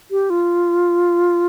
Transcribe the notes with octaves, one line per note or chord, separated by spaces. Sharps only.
G4
F4